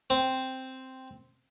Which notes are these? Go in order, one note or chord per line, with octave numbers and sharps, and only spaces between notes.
C4